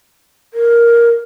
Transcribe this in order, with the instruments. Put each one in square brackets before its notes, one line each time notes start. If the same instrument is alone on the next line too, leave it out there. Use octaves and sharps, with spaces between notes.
[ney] A#4